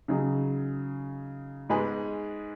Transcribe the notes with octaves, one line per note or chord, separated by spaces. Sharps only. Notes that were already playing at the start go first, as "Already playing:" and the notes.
C#3 F#3 D#4 G#4
G#2 G#3 B3 G#4 B4